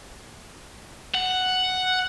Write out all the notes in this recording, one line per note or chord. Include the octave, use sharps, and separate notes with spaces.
F#5